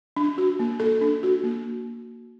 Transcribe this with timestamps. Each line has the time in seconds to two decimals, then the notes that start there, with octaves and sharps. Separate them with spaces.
0.17 D4
0.38 F#4
0.59 A#3
0.80 A4
1.01 D4
1.23 F#4
1.44 A#3